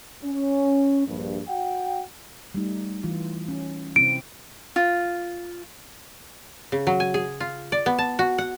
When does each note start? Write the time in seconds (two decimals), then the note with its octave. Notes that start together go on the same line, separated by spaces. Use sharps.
0.23 C#4
1.06 A#1 G2
1.48 F#4 F#5 G5
2.54 G3 A3 D#4
3.04 E3 F4
3.48 C#4
3.96 C3 C4 E4 D7
4.76 F4
6.72 C#3
6.87 F#3
7.00 G#5
7.14 G#4
7.40 F4
7.72 D5
7.86 B3
7.98 A5
8.19 F#4
8.38 F#5